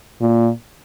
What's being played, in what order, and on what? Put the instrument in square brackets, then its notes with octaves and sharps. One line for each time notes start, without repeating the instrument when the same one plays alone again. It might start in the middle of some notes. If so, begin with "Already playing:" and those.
[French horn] A#2